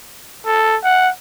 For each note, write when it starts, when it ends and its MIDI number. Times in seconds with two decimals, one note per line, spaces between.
0.46 0.77 69
0.84 1.10 78